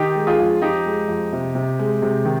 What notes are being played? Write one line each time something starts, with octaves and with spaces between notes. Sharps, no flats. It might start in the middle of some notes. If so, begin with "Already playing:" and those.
Already playing: D#3 D#4 G4
G#3
F4 G#4
F2
F2 D#4 G4
G#3
F2
C3
C3
G#3
C3
D#3